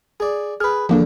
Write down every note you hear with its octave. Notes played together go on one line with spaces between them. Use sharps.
G#4 D5
G#4 B4 F6
E2 D3 F3 A#3 D4